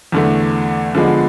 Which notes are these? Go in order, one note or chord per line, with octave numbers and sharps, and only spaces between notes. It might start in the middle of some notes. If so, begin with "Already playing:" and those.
E2 D3 A3
D3 F3 G#3 B3